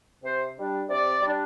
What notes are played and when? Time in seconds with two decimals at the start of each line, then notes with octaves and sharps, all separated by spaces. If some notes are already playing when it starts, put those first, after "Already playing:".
0.23 C3 C5
0.56 G3 D4
0.89 C3 D5
1.22 G3 D4